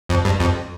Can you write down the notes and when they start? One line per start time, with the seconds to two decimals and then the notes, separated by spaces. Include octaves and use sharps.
0.09 F2
0.25 G2
0.40 F2